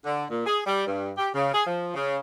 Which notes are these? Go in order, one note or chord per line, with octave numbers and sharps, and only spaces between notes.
D3
A#2
G#4
G3
G2
G4
C#3
G#4
F3
C#3